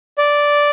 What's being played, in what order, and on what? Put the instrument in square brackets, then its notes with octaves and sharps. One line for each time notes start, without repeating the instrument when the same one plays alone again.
[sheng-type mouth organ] D5